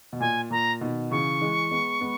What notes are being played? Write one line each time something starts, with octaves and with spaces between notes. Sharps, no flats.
B2
A#2 G#5
A#2 A#5
B2 D#3
C#3 E3 C#6
E3 G#3
G#3 B3
G#3 B3